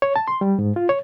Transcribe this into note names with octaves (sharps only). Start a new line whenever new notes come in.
C#5
A5
C6
G3
G#2
F4
C#5